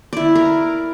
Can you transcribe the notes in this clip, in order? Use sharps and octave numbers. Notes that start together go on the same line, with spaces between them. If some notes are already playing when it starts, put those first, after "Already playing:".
E4 D5
A#4